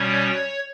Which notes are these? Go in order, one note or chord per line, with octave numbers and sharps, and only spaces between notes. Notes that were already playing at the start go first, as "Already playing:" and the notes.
Already playing: B2 G3 C#4 C#5